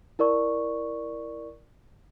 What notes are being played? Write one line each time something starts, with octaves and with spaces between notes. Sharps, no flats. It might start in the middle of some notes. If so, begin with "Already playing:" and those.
E4 A#4 D5 C#6